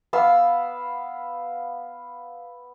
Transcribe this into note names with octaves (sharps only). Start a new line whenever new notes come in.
B3 F5 E6